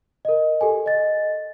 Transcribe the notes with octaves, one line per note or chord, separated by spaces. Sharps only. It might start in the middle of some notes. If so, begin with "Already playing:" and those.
A#4 D#5
G4 A4 G#5
D#5 A6